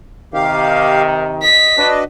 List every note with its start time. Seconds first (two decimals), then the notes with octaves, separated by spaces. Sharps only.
0.34 C3 D#3 G4 F5
1.43 D#5 B6
1.77 D4 F#4 B4 D#5